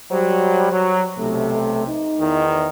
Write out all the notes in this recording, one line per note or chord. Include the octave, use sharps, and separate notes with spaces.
F#3 G3 C5
F#3
B1 C3 A3
D#4
E2 D#3